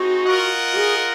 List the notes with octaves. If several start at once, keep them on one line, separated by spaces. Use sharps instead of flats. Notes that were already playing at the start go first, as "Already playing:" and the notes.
Already playing: C4 D#4 F#4 G#4
F4 A#4 D#5 F#5
F#4
G#4